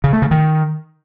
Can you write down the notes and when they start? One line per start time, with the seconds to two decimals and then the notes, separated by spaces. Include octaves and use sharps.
0.04 C#3
0.13 A3
0.22 C#3
0.31 D#3